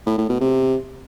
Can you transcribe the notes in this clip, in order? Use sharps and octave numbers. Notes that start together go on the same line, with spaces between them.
A2
A2
B2
C3